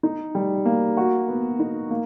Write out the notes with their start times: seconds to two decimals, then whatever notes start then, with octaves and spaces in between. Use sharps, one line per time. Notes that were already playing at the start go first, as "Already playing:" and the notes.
0.03 D#4
0.35 G3
0.65 A#3
0.97 F#4
1.28 B3
1.59 D#4
1.91 A#3